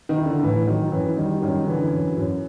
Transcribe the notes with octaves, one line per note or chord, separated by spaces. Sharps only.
D#3
E4
D3
A2 E3
D#3 F#3
F#2 E3
D#3 G3
F#2 D#3
D3 E3
F#2
F#2